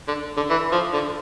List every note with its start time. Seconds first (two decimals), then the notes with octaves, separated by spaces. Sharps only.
0.08 D3
0.37 D3
0.50 E3
0.72 F3
0.93 D3